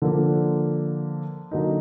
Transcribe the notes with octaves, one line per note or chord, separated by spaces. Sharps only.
D3 F3 A#3
D3 F#3 A#3 D#4